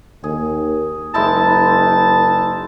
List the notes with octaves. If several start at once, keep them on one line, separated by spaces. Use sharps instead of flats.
D#2 G#4
F#1 G#3 D#4 E4 A5